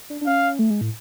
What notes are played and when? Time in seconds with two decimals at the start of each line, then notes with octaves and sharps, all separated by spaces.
0.10 D4
0.21 D4
0.26 C#4 F5
0.59 A3
0.70 G#3
0.81 A2